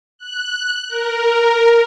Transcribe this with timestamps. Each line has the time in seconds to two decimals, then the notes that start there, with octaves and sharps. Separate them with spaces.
0.18 F#6
0.88 A#4